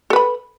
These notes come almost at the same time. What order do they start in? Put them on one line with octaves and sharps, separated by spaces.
A4 B4 B5